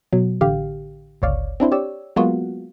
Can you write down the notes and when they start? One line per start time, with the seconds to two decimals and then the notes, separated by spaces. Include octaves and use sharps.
0.13 B2 F#3
0.41 A1 D3 G4 F5
1.22 G1 C#2 C#5 D5 F5
1.60 C4 D4 E4 C5
1.72 G4 C#5 D5 E6
2.16 F#3 G#3 A#3 B3 F4 F#4